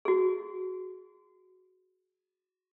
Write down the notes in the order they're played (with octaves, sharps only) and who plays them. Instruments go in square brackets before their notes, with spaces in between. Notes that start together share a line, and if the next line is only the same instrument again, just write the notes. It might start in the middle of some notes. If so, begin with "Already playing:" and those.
[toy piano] F#4 G#4